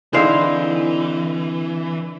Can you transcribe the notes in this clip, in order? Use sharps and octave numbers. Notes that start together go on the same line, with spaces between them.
D3 E3 C4 D#4 E4 G#4 F5